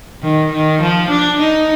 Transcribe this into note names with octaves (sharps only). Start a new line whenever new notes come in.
D#3
D#3
F3
D4
D#4